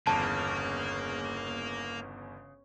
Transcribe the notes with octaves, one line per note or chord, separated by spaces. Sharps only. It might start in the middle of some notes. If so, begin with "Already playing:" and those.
G1 E2 C#3 A#3 A5